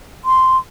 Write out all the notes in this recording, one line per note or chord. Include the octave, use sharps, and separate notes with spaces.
C6